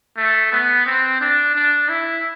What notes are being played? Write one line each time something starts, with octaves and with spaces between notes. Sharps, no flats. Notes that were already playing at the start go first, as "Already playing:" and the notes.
A3
B3
C4
D4
D4
E4